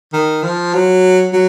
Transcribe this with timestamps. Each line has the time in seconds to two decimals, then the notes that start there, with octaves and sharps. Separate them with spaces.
0.13 D#3
0.43 F3
0.73 F#3
1.33 F#3